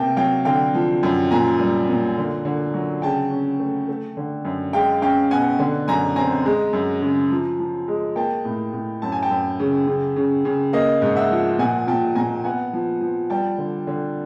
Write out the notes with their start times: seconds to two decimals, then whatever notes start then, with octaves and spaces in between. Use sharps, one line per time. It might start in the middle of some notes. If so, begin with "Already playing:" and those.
Already playing: C3 A#3 G5 A5
0.17 F#3 F5 G5
0.45 D3 F5 G5
0.74 F3
1.03 F#2
1.31 A#2 G#5 A#5
1.59 G3
1.89 A#2
2.17 D3
2.45 D3
2.74 F#3
3.02 C#3 G5 A5
3.31 C#4
3.59 A3
3.88 A3
4.17 D3
4.45 F#2
4.73 G#3 F5 G5
5.02 C#4 F5 G5
5.31 B2 F#5 G#5
5.59 D3
5.88 F#2 G#5 A#5
6.16 C4 G#5 A#5
6.46 G#3
6.73 F#2
7.02 C#3
7.31 F3
7.60 F3
7.88 G#3
8.16 A#3 G5 A5
8.45 A2
8.73 A2
9.02 F#2 A5
9.12 G#5
9.22 G5 A5
9.31 F#2
9.59 C#3
9.87 C#3
10.16 C#3
10.45 C#3
10.73 A#3 D#5 F5
11.02 G#2
11.16 E5 F#5
11.31 F3
11.59 A#2 F#5 G#5
11.87 A#2 G5 A5
12.15 A#2 G#5 A#5
12.44 B3 F#5 G#5
12.73 F3
13.01 F3
13.30 G3 G5 A5
13.58 D3
13.87 D3